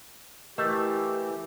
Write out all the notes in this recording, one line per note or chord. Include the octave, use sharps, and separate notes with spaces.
E3 A3 G4 A#4 D#5